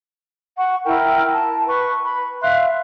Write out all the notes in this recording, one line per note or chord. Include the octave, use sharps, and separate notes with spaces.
F#5 C#6
E4 A#4 G5
A5
B4 C#6
B5
E5 F5 C6 F#6